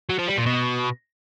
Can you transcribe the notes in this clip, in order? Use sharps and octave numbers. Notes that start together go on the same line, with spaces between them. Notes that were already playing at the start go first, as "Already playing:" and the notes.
F#3
F3
G3
A#2
B2